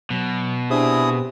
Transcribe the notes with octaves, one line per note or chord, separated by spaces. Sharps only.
B2 F#3
C3 D4 E4 G#4 D#6